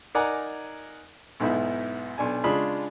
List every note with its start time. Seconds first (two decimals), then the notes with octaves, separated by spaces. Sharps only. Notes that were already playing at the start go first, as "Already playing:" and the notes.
0.15 D#4 A#4 D5 F#5 G#5 A#5
1.40 B1 G#2 B3 E4
2.18 B1 D4 G#5
2.44 C#3 G#3 D4 F4 G#4 B5